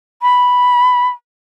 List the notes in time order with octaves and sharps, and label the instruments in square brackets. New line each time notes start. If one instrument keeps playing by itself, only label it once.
[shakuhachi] B5